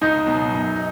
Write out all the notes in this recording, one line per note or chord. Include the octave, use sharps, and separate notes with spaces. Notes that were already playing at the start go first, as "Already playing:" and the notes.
C#2 D#4
B2 F#3 B3
F#2
D#4